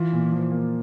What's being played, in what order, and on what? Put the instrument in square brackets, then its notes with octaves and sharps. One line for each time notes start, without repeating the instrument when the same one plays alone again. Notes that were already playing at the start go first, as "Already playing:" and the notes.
Already playing: [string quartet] E3 [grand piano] F4
[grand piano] A#2
F3
A#3